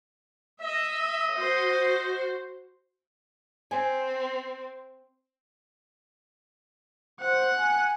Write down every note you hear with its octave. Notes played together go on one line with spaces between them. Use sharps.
D#5 E5
F#4 C5
C4 G#5
C5 F#5
G#5